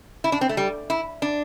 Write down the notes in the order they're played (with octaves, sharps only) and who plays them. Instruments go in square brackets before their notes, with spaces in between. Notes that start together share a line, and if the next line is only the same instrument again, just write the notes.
[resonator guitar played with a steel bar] E4
D4
C4
A3
G3
E4
D4